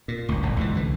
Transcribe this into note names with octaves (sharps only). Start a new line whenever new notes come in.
A#2
G1 D2
G1 A2
C#2 F#2 D3 E3
C2 D3 E3